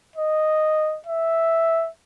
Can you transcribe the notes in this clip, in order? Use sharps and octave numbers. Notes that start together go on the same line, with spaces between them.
D#5
E5